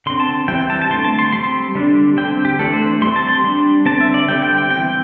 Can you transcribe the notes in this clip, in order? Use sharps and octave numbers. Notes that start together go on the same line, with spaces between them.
D3 C4 C6
A5
E3 G3 C4 G5
A5
A5
D3 A3 C4 C6
A5
C6
G3 C4 C6
D3 G3 D4
D3 C4 G5
G4
E3 A3 D4 A4
C5
G3 C4 C6
A5
C6
G3 D4
D3 C4 A5
E5
D5
D3 G3 C4 G5
G5
G5
E3 C4 G5